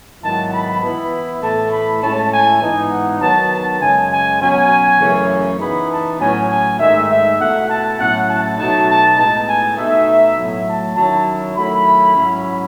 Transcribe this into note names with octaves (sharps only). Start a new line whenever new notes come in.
G#2 D#3 F#3 B3 E4 A5
B5
E3 B3 E4
A2 E3 A3 A5
B5
A2 G#3 C#4 E4 A5
G#5
G#2 E3 B3 D#4
F#5
D#3 F#3 B3 A5
A5
F#2 C#3 G#3 G#5
G#5
B2 F#3 C#4 G#5
F#2 C#3 E3 A3 C#4
E3 B3 D#4 B5
A5
A2 F#3 C#4 G#5
G#5
G#2 D#3 A3 D#4 E5
E5
B2 A3 E4 F#5
A5
A2 F#3 C#4 E4 F#5
A5
B2 F#3 A3 D#4 A5
A5
A2 G#3 B3 D#4 A5
G#5
B2 A3 D#4 E5
A2 F#3 A3
A5
D#3 F#3 C#4 E4 A5
D#3 F#3 A3 E4 B5
G#2 F#3 C#4 E4